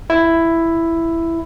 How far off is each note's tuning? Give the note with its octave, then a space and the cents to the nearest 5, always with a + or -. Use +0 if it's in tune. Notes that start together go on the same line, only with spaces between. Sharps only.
E4 +5